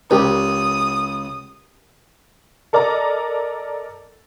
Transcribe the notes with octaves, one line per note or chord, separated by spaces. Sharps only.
C#2 G4 A#4 D#6
A4 A#4 D5 D#5 A#5